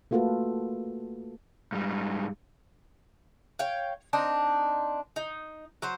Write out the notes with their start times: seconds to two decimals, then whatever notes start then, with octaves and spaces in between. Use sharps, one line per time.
0.11 A3 A#3 F4 F#4 A4 B4
1.72 G#2 G3
3.59 C#5 F5 G5
4.13 C4 D4 D#4
5.16 D#4
5.82 F#3 C5